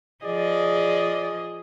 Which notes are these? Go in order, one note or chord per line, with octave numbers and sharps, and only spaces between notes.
F3 G#4 D5 D#5